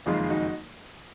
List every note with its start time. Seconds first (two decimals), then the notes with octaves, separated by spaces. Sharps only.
0.06 F#1 F2 D#3 G#3 F4 G#4
0.30 D#4 F#4